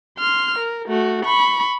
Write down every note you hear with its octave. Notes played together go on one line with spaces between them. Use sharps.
C6 F6
A#4
A3 F#4
B5 C#6